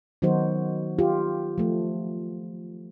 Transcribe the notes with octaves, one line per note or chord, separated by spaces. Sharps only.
D#3 F#3 B3 D#4 F#4 C5
F4 G4
F3 A3